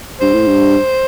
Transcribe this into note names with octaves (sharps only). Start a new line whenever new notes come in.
G2 C5
A2
G2